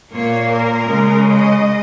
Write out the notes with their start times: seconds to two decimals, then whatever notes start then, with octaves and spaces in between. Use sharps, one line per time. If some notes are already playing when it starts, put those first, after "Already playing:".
0.12 A#2 A#3 C#5
0.51 A#4
0.90 C#3 G#3
1.29 D#5